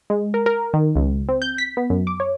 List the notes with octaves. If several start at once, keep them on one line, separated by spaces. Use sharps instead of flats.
G#3
A#4
A#4
D#3
C#2
C4
G6
B6
B3
F#2
D6
C#5